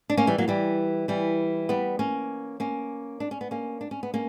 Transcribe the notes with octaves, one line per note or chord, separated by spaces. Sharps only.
D4
A#3 C#4
E3 G3
F#3 A#3
E3 G3
E3 G3
G3 B3
A#3 C#4
A#3 C#4
D4
C#4
B3
A#3 C#4
D4
C#4
B3
A#3 C#4